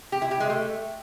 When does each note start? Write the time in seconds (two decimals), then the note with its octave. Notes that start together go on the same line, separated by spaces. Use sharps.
0.12 G4
0.22 E4
0.31 G4
0.40 G#3
0.50 A3